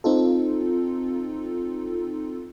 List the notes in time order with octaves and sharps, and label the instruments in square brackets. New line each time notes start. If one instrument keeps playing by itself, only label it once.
[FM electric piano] C4 D#4 F4 A4